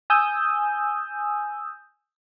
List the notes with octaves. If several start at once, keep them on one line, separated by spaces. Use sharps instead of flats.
G#5 D#6 E6 G6